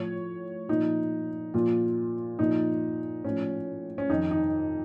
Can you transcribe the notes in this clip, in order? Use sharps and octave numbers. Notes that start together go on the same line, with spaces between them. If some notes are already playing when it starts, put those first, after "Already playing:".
Already playing: A2 F3 C#5
A#2 F3 D#4
A#2 F3 F4
A#2 F3 D#4
A2 F3 C#4
C#4
F2 D#3 D#4
D#4